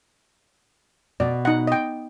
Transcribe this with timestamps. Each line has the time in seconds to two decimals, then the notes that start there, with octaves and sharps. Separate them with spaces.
1.20 B2 D5
1.45 D#4 F#5
1.67 D#5 G5